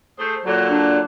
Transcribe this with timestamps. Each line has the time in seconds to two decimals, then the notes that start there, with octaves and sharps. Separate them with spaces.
0.19 A3 G#4 C5
0.46 A#2 D3 F#3
0.70 D4